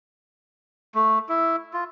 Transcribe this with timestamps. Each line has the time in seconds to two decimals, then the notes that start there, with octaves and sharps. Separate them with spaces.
0.95 A3
1.29 E4
1.73 F4